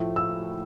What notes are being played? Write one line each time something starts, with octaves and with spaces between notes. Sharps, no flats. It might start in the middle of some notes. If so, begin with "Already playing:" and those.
Already playing: A2 F3 A3
E6